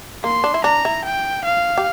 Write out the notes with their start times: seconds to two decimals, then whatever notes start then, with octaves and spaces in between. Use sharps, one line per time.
0.24 A#3 C6
0.44 D4
0.54 E4
0.64 D4 A#5
0.85 E4
1.04 G5
1.44 F5
1.78 G4